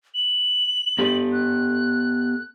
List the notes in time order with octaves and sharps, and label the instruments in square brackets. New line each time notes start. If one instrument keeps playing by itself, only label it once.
[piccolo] F#7
[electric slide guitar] B3 G4 A4
[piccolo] F#6